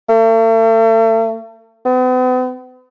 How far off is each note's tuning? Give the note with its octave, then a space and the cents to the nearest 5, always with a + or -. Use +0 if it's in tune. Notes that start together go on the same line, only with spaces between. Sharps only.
A3 +40
B3 +45